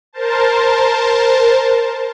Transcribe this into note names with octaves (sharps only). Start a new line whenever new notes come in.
A#4 C5 A5